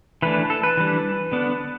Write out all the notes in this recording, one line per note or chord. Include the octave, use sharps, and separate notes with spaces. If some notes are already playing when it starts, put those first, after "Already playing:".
E3 A3 D4 B4
A4
B4
E3 G3 D4
D3 B3 D4